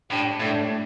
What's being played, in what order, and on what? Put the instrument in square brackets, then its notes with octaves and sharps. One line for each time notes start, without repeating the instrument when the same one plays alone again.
[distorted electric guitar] A2 [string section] D4 G4
[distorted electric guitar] A2 [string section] A3 D4